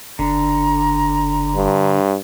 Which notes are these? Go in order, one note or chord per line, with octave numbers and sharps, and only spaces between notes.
F#1 D3 A#5
G2